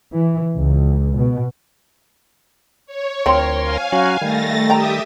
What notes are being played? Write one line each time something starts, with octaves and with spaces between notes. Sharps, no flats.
E3
C#2
B2
C#5
D2 F3 C4 A#4 C6
F5 G#5
F#3 C#4 F#4
D#3 G3 A3 A6 A#6
G4 E5 G5 A#5 D#6